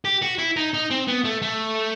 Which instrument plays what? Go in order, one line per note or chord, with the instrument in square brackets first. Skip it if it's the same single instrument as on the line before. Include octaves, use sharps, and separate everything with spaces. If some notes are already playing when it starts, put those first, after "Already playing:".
[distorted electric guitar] G4
F#4
E4
D#4
D#4
C4
B3
A3
A3